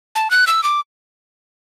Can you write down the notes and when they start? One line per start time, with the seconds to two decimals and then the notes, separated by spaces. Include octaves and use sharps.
0.15 A5
0.31 F#6
0.47 E6
0.63 D6